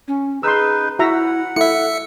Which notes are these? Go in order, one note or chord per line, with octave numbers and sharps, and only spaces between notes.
C#4
D#4 G#4 B4 C6 E6
E4 F#4 E5 F#5 A#5
E4 A4 E5 C#7